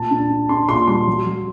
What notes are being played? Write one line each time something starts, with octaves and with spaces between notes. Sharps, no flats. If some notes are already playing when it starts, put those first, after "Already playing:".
Already playing: A#2 A5
D4
D4
D4 C6
A#2 C6
G3 C6
F#3
F#3